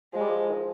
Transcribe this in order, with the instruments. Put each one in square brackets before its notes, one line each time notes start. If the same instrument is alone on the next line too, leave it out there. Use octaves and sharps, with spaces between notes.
[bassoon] F3 [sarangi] G#3
[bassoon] G3
F3
D#3
F3